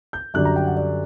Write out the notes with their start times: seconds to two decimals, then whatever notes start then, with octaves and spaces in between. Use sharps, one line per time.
0.13 G6
0.34 F#2 D3 G3 D4 F#6
0.45 A#5
0.56 G5
0.66 F#5
0.76 D5